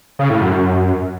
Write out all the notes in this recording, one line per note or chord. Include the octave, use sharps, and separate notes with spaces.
C#3
A2
F#2